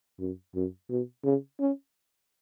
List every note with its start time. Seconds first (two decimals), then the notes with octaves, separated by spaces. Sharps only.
0.20 F#2
0.55 F#2
0.90 B2
1.25 C#3
1.60 C#4